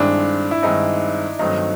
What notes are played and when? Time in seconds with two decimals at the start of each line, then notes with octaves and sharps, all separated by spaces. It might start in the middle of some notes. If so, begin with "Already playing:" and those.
Already playing: G2 D#3 G#3 C4 D4 E4
0.51 E4
0.62 G2 D#3 G#3 C4 D#4 E4
1.39 G2 D#3 F#3 A3 C4 D#4